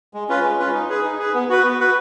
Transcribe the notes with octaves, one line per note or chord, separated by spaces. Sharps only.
G#3
C#4 F4 B4
G#3
C#4 F4 B4
D#4
G#4 B4
D#4
G#4 B4
B3
F#4 B4
B3
F#4 B4